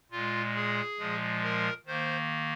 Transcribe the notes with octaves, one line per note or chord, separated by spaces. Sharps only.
A#2 G#3 F4
G#4
A#2 F3 G#3
A#4
D#3 A#3 C5